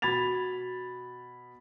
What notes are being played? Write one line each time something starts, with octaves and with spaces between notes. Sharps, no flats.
B2 B5 G#6 A6 F7